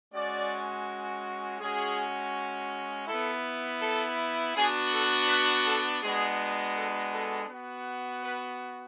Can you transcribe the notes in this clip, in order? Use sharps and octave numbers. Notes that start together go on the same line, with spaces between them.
G#3 C#4 F#4 D5
G#3 C#4 F#4 G#4
B3 E4 A4
A4
B3 D4 F#4 G#4
A4
B4
A4
G#3 B3 D4 F#4 G#4
A4
A4
B3 F#4
B4